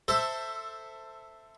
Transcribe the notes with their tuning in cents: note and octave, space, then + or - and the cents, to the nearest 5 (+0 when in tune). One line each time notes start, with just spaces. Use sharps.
A4 +15 C5 +0 E5 +0